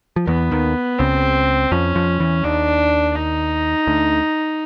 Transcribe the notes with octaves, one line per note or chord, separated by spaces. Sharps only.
F3
E2 E3 B3
D#2 D#3
C#2 C#3 C4
F2 F3 C#4
F2 F3
E2 E3
D#2 D#3 D4
D#4
D2 D3